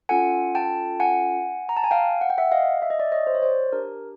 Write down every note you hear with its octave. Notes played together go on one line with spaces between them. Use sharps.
C#4 F4 A4 F#5 G#5
G5 A5
F#5 G#5
A#5
A5
G#5
F5 G5
F#5
G5
E5 F#5
D#5 F5
E5
D#5
D5 E5
C#5 D#5
C5
C#5
C5 D5
D4 G4 A#4